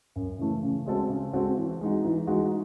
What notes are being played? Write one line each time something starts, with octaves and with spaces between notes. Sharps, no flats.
F#2
C#3 E3 A3
C#3
G#3 C4 F#4 A4
C#3
G#3 C4 F#4 A4
E3
G#3 D#4 F#4
E3
G#3 D#4 F#4